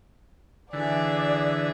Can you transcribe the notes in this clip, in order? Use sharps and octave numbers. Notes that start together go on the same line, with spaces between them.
D3 E3 G#4 D5 E5